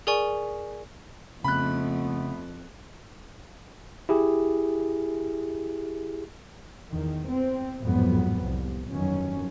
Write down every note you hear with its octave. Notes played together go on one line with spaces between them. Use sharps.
G#4 A#4 D5 G#5 C#6
F2 C#3 A3 B3 B5 F#6
E4 G4 G#4
E2 D#3
C4
G#1 F2 A2 F#3 B3
C2
G1 F2 D#3 F#3 C#4